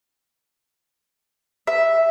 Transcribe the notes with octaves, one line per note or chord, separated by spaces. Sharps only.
E5